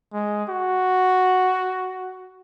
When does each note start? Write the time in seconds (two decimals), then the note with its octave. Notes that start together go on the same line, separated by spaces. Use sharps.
0.13 G#3
0.49 F#4